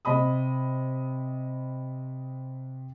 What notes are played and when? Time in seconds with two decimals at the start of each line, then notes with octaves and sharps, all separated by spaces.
0.05 C3 D#5 B5 D#6